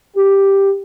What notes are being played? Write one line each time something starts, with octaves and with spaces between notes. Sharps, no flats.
G4